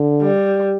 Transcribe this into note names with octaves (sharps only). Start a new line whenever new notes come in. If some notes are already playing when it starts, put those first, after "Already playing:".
Already playing: D3
G3